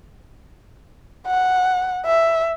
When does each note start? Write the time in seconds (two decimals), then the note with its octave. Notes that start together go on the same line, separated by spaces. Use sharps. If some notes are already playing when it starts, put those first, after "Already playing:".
1.27 F#5
2.06 E5